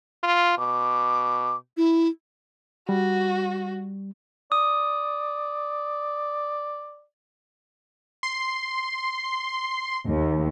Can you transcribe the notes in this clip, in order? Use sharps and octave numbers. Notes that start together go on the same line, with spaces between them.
F4
B2 D6
E4
G3 F#4
D5 D#6
C6
D#2